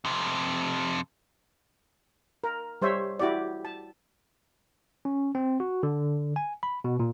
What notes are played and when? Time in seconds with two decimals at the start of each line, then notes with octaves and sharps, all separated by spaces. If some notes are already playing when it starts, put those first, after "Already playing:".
0.05 F2 C3
2.44 A#4
2.82 G3 C5 C#5 E5
3.19 E4 F#4 G4 D5
3.65 A5
5.05 C#4
5.35 C4
5.60 F#4
5.83 D3
6.36 G#5
6.63 B5
6.84 B2
6.99 A#2